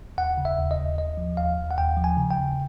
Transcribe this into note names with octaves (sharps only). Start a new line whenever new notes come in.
D#2 F#5
C#3
E5
D#2
D#5
D#2
D#2 D#5
F3
D#2 F5
D#2
F#5
D#2 G5
F3
G#5
C#3
G5
D#2